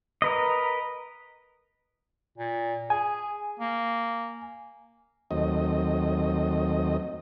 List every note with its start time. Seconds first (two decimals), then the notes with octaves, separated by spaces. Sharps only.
0.22 A#4 B4 D#5
2.38 A#2
2.90 G#4 G#5
3.60 A#3
5.31 D#2 F#3 A3 C4 D#5